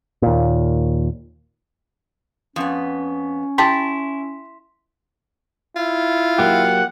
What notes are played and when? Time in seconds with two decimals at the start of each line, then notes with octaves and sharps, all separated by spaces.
0.22 D#2 A#2
2.56 F2 B3 C#4
3.58 E4 G4 A5 C6 B6
5.76 E4 F4
6.38 F#3 A#3 G4 F#5